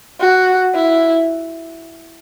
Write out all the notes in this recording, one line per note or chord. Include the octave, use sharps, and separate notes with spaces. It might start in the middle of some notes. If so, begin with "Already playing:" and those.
F#4
E4